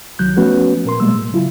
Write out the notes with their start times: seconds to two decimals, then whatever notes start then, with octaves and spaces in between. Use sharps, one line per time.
0.19 C2 D#3 F#3 F#6 G6
0.36 F3 A3 B3 C#4 F#4 B4
0.85 A#2 A#4 C6
1.00 B2 G3 G#3 A#3 E6
1.15 A2
1.33 C#3 F#3 E4 F4